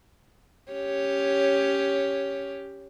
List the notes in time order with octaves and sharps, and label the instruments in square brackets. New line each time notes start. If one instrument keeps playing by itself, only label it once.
[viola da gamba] C#4 G4 C#5